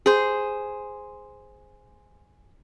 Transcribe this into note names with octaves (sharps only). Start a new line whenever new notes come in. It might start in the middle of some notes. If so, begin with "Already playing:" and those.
G#4 C5